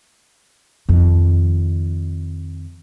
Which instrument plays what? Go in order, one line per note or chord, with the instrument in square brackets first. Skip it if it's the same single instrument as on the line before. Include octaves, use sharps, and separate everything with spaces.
[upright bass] F2 D#3